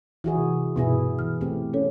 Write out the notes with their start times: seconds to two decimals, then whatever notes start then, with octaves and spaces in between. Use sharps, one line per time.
0.24 E3 E4 F#4 G#4
0.36 C3
0.76 G2 B2 B3 E4 G#4
1.19 E3 F6
1.41 A3 C4 G4
1.73 C#4 A4 C#5